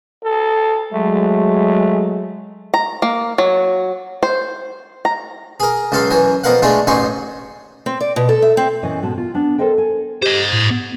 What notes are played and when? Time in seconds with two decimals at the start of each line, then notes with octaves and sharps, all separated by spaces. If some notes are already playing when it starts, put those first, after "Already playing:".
0.24 A4
0.93 F#3 G#3 A3
2.74 A#5
3.02 A#3
3.38 F#3
4.23 C5
5.05 A#5
5.60 G#4 A#4
5.92 C#2 F#2 A4 F5 C6
6.11 F#2 E3 G#5
6.44 F2 B3 A#4 F5 F#5
6.62 G#3 A3 D4 F4
6.87 A1 F#2 D#4 G#5 C6 C#6
7.86 C4
8.01 D5
8.16 B2
8.29 A4
8.42 E5
8.57 C4
8.83 A#2 E3 C#4 D#5
9.02 G#2 B2 F#4 A5
9.18 F4
9.34 B3 D4
9.58 A4 A#4 C5 D#5 G5
9.78 G#5
10.22 G4 C5 D#5
10.52 A2
10.70 B3